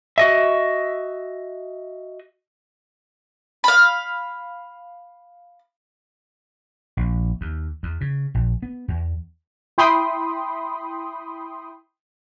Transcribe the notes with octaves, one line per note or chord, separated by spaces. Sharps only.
F#4 D#5 E5
F5 B5
A#1
D#2
E2
C#3
A#1
B3
E2
E4 G5 B5 C6 D#6